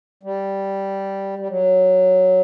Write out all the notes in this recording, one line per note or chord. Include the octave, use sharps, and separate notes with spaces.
G3
G3
F#3